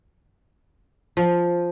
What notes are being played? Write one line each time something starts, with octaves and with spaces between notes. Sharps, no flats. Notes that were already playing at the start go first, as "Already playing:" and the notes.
F3